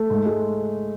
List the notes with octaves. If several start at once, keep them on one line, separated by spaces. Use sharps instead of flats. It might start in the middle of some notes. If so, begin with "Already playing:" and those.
Already playing: A3
G#2
G#3